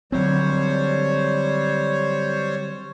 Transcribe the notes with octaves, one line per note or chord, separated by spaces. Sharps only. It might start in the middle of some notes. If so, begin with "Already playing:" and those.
D3 F#3 G3 C4 C5 C#5